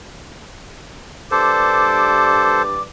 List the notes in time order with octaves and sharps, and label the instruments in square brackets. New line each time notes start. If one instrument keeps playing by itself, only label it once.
[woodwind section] G2 D5 D6 [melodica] A4 C5